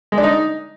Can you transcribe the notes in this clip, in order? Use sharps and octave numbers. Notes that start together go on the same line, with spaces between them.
G#3
D4
D#4